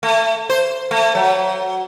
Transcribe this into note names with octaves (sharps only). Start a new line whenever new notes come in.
A3
C5
A3
F#3